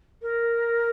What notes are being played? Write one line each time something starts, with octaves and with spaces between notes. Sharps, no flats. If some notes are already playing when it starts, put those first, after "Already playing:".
A#4